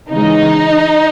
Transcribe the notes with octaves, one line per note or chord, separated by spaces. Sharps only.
C#3 E3 G#3 D#4